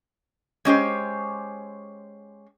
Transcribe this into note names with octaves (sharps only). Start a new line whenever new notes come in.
G#3 C#4 G4 C5